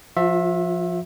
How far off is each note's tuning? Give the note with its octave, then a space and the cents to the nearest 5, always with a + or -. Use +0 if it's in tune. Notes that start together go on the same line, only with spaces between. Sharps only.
F3 +0 F4 +40 E5 +0